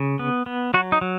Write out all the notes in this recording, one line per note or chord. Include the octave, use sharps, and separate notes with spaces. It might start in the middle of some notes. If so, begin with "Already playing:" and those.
Already playing: C#3
B3
B3
F#3 F#4
D#4
F#3